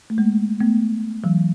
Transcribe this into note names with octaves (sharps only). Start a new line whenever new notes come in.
A3
G#3 A#3
A3 B3
E3 F#3